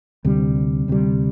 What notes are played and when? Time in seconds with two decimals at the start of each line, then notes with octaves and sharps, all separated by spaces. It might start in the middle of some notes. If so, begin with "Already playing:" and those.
0.25 D2 C3 G3
0.88 D2 C3 G3